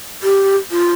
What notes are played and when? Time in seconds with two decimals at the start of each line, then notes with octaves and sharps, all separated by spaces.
0.23 G4
0.71 F4